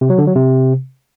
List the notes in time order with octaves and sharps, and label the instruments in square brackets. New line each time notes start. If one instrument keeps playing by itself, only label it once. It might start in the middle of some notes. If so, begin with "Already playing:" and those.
[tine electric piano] C3
F#3
D3
F#3
C3